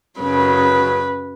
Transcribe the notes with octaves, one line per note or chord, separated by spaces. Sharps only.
F#2 C#3 F#3 B4